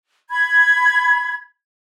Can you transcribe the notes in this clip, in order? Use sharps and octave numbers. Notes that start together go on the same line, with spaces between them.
B5 G#6